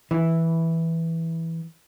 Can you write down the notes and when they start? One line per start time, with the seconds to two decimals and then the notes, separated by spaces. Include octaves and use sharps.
0.11 E3 E4